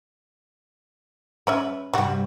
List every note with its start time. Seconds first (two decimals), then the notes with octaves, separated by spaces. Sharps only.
1.47 C#3 C#4 B4 E5
1.93 G2 C3 G3 F#4